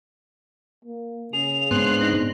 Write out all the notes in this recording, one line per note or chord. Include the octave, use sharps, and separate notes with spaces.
A#3
C#3 G#4 F7
G#2 B3 C4 D4 C6 F#6
D#4 A#6